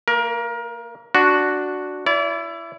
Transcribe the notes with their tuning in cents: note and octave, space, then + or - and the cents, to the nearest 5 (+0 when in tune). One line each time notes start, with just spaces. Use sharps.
A#3 -30 A#4 +25
D4 +0 F#4 +0
E4 +20 D5 -35